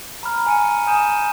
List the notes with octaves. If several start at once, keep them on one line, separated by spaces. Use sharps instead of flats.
A#5 B5 F6
G#5 C#7 D#7
G#5 D#6 G6 D#7 E7